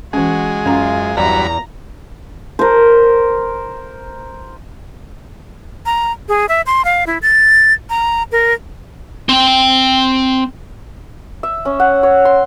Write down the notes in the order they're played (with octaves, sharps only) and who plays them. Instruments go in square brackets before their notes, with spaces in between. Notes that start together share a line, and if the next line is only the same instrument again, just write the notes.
[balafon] E3 C#4 [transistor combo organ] G#3 [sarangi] F#4
[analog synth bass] F#2 [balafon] C#4 A#5 [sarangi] F4
[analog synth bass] E2 [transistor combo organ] G2 F#3 B5 [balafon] D5 [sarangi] A#5
[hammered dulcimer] A#4 C5
[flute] A#5
G#4
E5
C6
F5
E4
A6
A#5
A#4
[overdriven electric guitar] C4 G5
[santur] E5
C#4
F#5
C#5
C6